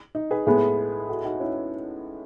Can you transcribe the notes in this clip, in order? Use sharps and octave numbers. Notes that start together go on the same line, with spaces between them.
D#4
G#4 B4
A2 G#3 B3
F#4 A4
D#4 F#4
C#4 E4